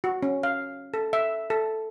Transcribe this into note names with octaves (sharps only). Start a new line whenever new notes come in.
F#4
C#4
F5
A4
E5
A4